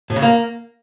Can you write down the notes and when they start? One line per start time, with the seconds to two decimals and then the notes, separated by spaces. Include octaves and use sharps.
0.10 A2
0.16 C#3
0.22 A#3